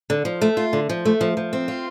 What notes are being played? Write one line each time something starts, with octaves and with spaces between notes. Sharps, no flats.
D3
F3
A3
F4
D3
F3
A3
F3
F3
C4
F4